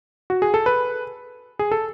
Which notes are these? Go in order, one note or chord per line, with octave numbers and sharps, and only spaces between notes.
F#4
G#4
A4
B4
G#4
A4